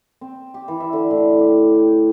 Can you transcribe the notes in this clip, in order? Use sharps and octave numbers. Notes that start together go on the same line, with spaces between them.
C4
G4
E3
E5
D3
A2
G4
G4